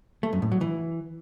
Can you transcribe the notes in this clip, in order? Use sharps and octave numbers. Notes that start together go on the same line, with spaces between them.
A3
F#2
A2
F#3
E3